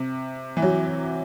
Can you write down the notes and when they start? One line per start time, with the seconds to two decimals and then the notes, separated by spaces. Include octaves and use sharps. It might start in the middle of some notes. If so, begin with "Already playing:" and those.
Already playing: C3
0.57 E3
0.62 F#3